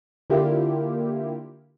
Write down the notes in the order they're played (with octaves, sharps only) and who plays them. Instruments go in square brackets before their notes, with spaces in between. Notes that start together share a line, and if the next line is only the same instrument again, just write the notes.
[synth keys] D3 A#3 E4 F4 G4